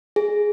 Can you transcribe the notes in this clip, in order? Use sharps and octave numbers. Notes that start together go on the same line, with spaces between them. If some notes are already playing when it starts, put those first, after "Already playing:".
G#4